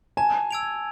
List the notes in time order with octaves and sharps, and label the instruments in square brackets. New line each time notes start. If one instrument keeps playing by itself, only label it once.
[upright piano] G#5 [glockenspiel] A5
[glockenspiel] E6 G#6 D7 F7